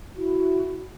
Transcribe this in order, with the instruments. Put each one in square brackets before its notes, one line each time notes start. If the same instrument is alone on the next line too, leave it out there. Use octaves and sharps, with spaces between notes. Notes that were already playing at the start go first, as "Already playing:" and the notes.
[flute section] E4 F#4